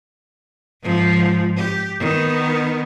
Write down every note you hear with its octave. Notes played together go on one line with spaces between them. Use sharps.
G#2 F3
G4
D#3 B3